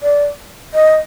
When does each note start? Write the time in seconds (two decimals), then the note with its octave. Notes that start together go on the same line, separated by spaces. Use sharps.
0.03 D5
0.74 D#5